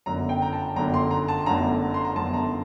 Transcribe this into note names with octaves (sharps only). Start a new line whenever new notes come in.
G1 F#2 D3 A#5
G5
A#5
A5
G1 F#2 D3 A#5
C6
A#5
A5
G1 F#2 D3 A#5
C6
A#5
G1 F#2 D3 A5
A#5